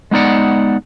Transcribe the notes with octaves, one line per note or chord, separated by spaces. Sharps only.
G#3 B3 D#4 D5 F#5